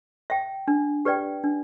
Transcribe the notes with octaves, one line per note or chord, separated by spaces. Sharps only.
E5 G5
D4
G4 B4 D5 G5
D4